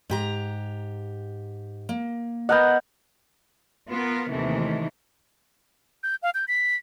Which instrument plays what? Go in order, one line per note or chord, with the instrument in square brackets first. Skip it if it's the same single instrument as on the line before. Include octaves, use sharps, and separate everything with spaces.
[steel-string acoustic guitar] G#2 G4 A#5
A#3
[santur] B3 A#4 F#5 [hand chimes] D#5 G6
[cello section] B3 F4 A#4 B4
D#2 C3 D#3 E3 A3
[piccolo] G6
F5
G6
B6